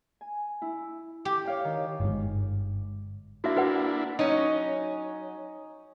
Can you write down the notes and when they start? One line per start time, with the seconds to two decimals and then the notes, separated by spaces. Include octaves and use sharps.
0.21 G#5
0.62 E4
1.25 G4
1.45 C#5 F5 G5
1.65 D#3
2.00 G1 G#2
3.44 A#3 D4 E4 F#4 E5
3.57 F#4 B4 F#5
4.19 F#3 C#4 D#4